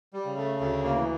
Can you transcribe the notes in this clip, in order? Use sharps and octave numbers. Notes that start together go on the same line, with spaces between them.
G3
C#3
A3
D2 A3
A#3
E3